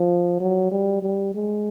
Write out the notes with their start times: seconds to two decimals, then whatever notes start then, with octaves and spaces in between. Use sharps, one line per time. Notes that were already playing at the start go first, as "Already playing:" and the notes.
Already playing: F3
0.40 F#3
0.71 G3
1.03 G3
1.35 G#3